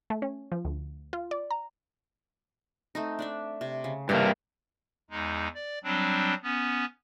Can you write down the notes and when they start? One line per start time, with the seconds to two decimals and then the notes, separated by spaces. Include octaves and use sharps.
0.10 A3
0.22 C#4
0.52 F3
0.65 D2
1.13 F4
1.31 D5
1.51 A#5
2.95 A3 C4 D#4
3.19 D4 D5 E5
3.61 C3
3.84 C#3
4.09 G2 C3 A#3 D#5 F5
5.10 E2 G#3 D#4
5.55 D5
5.84 F#3 G3 C4 D4
6.43 B3 C#4